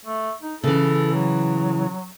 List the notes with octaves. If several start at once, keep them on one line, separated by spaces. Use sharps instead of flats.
A3
D#4
C#3 E3 A4
F#3